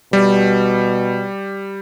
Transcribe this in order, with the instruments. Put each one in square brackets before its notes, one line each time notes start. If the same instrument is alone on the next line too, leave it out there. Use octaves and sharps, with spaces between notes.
[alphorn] B2 [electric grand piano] G3